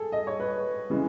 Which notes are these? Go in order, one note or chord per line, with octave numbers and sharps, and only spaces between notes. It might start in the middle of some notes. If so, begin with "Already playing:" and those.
Already playing: G#4 A4
D#5
C#5
B4
C#3 E3 G#3